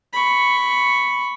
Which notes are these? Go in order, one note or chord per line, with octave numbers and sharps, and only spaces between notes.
B5 C#6